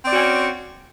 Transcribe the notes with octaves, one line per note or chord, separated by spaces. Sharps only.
C4 C#4 F#4 D5